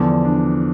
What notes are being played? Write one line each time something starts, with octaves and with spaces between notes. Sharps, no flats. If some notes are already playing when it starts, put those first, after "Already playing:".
Already playing: E2 D3 F3
D4